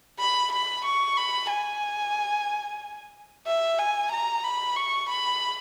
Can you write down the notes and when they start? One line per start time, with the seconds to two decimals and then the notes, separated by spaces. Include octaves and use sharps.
0.20 B5
0.53 B5
0.85 C#6
1.17 B5
1.51 G#5
3.47 E5
3.79 G#5
4.12 A#5
4.44 B5
4.77 C#6
5.09 B5